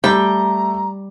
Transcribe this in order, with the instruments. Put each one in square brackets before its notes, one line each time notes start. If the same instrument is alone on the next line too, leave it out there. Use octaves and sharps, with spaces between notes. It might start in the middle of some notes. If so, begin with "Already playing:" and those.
[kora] G3 [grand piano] A3 [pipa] G5 [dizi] A#5